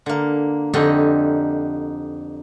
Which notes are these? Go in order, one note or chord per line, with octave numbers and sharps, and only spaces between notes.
D3 A#3
F2 D3 D#4 G4 D#5